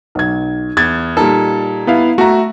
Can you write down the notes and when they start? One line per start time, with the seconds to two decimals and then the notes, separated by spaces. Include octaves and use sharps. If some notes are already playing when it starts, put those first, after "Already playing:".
0.15 B1 G#6
0.77 E2 G#6 A6
1.17 A#2 G3 D#4 A4
1.87 B3 E4 F5
2.18 A3 F#4 A#5